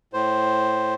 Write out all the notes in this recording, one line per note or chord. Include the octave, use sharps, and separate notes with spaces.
A2 C5